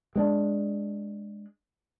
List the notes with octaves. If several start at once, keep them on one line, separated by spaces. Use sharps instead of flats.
G#3 C4 D4